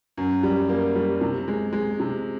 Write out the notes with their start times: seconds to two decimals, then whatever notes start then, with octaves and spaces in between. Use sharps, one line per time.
0.17 F#2
0.43 G3
0.69 A#3
0.96 G3
1.21 C3
1.48 G#3
1.73 G#3
2.00 C3